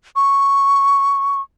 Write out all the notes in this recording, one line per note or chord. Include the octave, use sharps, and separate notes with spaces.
C#6